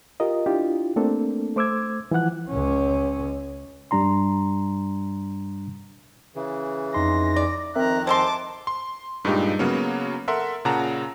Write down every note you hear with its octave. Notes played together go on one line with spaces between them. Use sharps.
F4 G4 A#4 D#5
D4 E4 F4 G4
A3 A#3 C4 D4 A4
A3 C5 D6 E6 G#6
E3 F3 E4 F#5 F#6
C#2 C#4
G2 G3 D4 A#5 C6
C#3 E3
F2 D#4 C6 A#6
D5
F2 D#3 C4 A#4 E5 A#5 F#6
G#3 A4 C5 A5 C6 D6
C6
G2 A#2 G#3 D#4 G4
C#3 F#3 A#3 B3 C#4
A4 A#4 E5 F#5 C6
A#2 C#3 F#5 A5 A#5